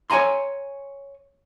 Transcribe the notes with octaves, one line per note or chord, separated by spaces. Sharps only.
C#5 F5 G#5 A#5 C6